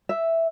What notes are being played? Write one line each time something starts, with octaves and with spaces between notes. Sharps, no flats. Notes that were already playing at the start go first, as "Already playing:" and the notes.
E5